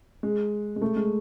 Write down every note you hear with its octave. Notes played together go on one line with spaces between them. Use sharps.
G#3
G#3
A3
G#3